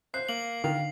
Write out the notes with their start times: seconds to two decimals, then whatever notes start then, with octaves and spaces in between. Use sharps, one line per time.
0.14 C5 F#6 C7
0.29 A#3 F#7
0.64 D3 D#3 F5